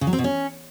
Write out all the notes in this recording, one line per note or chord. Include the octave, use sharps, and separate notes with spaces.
C#3
F#3
C4
B2
C#4